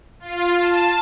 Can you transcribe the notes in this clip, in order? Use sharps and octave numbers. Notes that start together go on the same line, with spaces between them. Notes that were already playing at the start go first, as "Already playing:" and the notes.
F4
A5